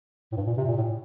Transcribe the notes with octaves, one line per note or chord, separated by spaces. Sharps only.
A2
G2
A#2
C3
A#2
A2